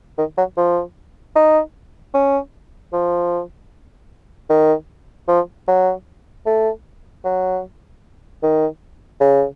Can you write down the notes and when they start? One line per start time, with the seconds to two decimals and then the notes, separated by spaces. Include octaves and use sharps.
0.18 D#3
0.37 F#3
0.57 F3
1.35 D#4
2.14 C#4
2.93 F3
4.49 D#3
5.28 F3
5.67 F#3
6.46 A3
7.25 F#3
8.42 D#3
9.20 C#3